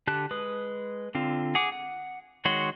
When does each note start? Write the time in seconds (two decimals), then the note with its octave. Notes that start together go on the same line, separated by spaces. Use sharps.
0.07 D3 G4 A5 F#6
0.31 G#3 B4 D#6
1.15 D3 C4 F4
1.55 G#4 F#5 D6
1.72 F#5
2.45 D#3 G#3 F#4 C#5 C6